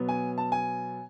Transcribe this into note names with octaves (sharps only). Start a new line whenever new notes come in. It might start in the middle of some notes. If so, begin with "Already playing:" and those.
Already playing: B2 F#3 B3
G#5
A5
G#5